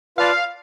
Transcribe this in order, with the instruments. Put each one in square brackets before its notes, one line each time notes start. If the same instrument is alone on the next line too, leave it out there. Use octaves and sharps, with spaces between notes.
[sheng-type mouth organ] F4 B4 D5 A5 [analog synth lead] F5